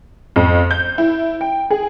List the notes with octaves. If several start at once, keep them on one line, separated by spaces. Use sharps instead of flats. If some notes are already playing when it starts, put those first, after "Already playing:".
F2
G6
E4
G5
G#4